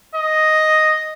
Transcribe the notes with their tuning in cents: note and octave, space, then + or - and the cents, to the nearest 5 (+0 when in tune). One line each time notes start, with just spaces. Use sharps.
D#5 +0